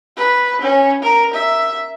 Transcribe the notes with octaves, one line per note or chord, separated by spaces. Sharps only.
B4
C#4
A#4
E5